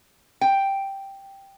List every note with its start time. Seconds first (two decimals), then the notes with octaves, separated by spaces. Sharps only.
0.41 G5